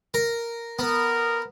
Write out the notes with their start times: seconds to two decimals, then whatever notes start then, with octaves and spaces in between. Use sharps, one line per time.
0.14 A#4
0.79 B3 A#4